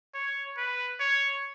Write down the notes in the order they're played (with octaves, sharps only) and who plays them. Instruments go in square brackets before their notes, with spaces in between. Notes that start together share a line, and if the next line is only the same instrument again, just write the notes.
[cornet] C#5
B4
C#5